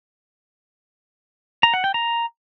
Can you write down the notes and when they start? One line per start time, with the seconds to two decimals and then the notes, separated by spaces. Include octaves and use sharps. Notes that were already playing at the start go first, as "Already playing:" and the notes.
1.63 A#5
1.74 F#5
1.84 G5
1.94 A#5